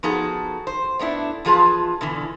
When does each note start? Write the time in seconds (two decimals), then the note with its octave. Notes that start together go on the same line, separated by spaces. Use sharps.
0.03 F3 B3 D#4 F#4 G#4 A4
0.67 C5
0.99 A3 B3 D4 E4
1.45 E2 F3 F4 G#4 B4 A5
2.01 B2 D3 E3